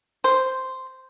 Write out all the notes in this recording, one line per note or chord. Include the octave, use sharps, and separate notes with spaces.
C5